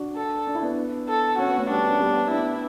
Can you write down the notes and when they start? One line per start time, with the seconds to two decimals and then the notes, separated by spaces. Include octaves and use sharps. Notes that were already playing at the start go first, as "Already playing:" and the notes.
Already playing: D4 F#4
0.16 A4
0.47 D4
0.55 E4
0.63 B3 D4
1.09 A4
1.39 C#4 F#4
1.48 B3
1.57 A3 C#4
1.69 G3 B3 D4
1.88 C#4
2.00 G3 B3
2.31 B3 D4 E4